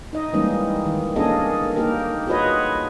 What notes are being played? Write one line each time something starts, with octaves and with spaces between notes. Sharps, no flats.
D#4 D#5
E3 G3 G#3 A#3 C#4 D#4
D#3
A#3 C#4 D4 G#4 A4 D#5
A#3 D#4 G4 A#4
F4 F#4 G#4 B4 C#5 D#5